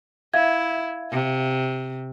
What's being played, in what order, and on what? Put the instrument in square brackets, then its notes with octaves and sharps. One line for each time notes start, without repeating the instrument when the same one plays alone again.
[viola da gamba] E4 [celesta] E5 F5 G#6
[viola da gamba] C3